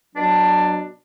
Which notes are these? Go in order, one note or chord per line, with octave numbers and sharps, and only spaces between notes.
B2 F#3 D4